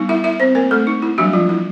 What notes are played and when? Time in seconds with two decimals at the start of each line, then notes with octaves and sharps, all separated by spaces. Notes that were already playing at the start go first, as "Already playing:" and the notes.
Already playing: G3 B3 D#4
0.09 E4 E5
0.24 E4 E5
0.40 C4 C5
0.55 A#3 A#4
0.71 A3 A4
0.87 D#4
1.02 E4
1.18 E3 F#3 G3 A#3 D4 F#4
1.33 F3 F4
1.49 E4